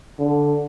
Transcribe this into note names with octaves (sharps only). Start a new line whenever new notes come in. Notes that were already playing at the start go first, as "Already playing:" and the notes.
D3